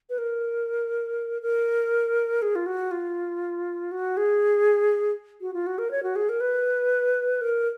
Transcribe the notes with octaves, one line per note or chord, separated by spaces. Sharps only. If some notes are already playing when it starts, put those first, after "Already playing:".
B4
A#4
A#4
G#4
F4
F#4
F4
F#4
G#4
F#4
F4
F#4
A#4
C#5
F#4
G#4
A#4
B4
A#4